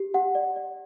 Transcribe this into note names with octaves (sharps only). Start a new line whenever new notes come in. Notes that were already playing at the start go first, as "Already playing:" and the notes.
Already playing: G4
G4 F#5
D5
D5